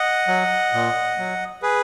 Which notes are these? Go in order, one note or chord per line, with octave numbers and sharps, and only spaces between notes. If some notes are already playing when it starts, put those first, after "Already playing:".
Already playing: D#5 F#5
F#3
A#2
F#3
G#4 B4